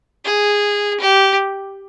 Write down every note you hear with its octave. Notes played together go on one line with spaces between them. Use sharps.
G#4
G4